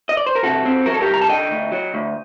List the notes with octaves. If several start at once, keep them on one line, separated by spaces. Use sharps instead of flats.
D#5
D5
C5
A#4
C3 F#4 A4
C4
F#3 A#4
A4
G4 A#4
C2
A#5
A5
D3 D#5 G5
D2
F#3
D2